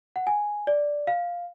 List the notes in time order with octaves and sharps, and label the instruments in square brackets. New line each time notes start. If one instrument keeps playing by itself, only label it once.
[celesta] F#5
G#5
D5
F5